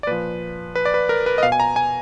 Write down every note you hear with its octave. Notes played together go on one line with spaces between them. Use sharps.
D5
A#2 F3 B4
B4
D5
B4
A#4
B4
D#5
B2 F5
G#5
A#5
G#5